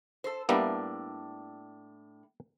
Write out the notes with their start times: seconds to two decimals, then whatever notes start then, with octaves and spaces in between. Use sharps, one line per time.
0.24 A4 C5
0.49 A2 G3 A#3 B3 D4